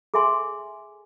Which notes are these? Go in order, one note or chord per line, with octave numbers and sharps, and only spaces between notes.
G#4 A4 E5 G#5 C6